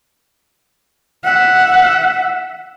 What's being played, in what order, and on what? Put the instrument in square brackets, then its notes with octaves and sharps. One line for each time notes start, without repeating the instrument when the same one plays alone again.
[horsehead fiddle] E5 F#5